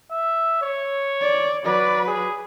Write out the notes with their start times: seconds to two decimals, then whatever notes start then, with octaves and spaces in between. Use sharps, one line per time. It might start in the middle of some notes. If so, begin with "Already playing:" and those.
0.11 E5
0.62 C#5
1.21 D5
1.65 F#3 B4 D5
2.07 G#4